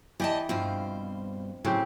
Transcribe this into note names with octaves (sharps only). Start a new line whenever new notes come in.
E3 G4 D5 D#5 A5
G2 B2 F3 C4 C5
A2 C#3 F#3 C4 G4